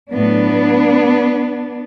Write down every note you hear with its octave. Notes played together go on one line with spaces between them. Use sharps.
A2 F#3 B3 D4